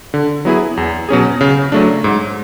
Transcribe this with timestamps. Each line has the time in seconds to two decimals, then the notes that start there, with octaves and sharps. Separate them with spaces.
0.14 D3
0.45 F#3 B3 E4 G#4
0.77 E2
1.09 B2 F#3 C#4 G#4
1.41 C#3
1.72 F#3 A3 D4
2.04 G#2